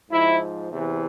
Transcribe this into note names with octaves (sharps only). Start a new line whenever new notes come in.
G#2 F3 E4
E2 C3 E3